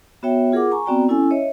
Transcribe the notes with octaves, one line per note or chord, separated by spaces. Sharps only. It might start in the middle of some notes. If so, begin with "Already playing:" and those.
B3 F#4 C#5 E5 G5
F4 G#4 A#4 F#5 D6
G#5 A#5 C#6
B3 C4 F#4 D5 G5 A#5
C#4 E4 A4 G#5 E6
C#5 D#5 E5